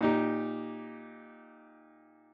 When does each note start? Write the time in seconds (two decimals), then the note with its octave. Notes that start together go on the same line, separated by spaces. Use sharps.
0.01 A#2 D#4 G4